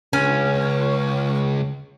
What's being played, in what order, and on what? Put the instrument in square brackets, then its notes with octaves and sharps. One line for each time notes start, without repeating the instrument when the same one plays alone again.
[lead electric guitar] C#2 [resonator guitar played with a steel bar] C#4